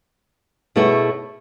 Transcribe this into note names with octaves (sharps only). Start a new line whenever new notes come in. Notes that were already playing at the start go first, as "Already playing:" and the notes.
B2 A3 E4 G#4 C#5